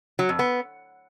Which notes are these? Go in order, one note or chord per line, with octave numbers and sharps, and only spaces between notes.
F#3
F2
B3